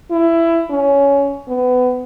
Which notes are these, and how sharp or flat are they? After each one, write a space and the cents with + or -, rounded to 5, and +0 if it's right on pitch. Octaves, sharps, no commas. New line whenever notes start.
E4 +15
C#4 +15
B3 +25